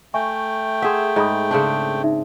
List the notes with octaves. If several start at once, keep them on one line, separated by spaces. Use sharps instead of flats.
A3 E5 G5 G#5 C#6
G#4 E5 F#5 C6
G#2 D#5 B5 D#6
C#3 C4 D4
D#4 E5